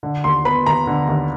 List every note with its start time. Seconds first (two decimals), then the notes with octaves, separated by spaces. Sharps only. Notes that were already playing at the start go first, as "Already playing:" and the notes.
0.03 D3
0.24 D#2 C6
0.45 B3 B5
0.66 D#2 A#5
0.87 D3
1.08 D#2